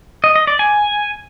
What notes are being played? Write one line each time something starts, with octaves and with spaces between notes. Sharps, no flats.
D#5
D#5
D5
G#5